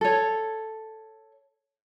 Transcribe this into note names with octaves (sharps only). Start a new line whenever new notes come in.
A4 C#5